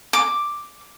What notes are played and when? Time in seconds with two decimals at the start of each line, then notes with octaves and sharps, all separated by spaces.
0.13 D6